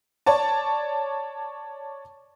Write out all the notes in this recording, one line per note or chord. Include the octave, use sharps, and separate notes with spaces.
C#5 D5 A5